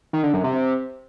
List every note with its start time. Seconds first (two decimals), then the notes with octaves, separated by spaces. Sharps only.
0.13 D#3
0.23 D3
0.34 F#2
0.44 C3